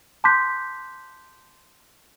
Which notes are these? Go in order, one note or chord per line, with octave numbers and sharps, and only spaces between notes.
A5 C6 D6 F#6 G6 B6